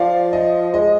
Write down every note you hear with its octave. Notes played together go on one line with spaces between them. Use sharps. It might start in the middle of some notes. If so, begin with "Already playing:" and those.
Already playing: F3 D5 F5
D#5
G#3 D#5